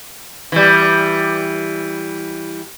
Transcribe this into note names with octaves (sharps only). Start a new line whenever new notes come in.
E3 G3